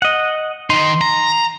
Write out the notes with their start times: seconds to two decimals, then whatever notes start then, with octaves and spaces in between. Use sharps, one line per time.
0.02 D#5 F#5
0.70 D#3 D#4 C6
1.01 A#5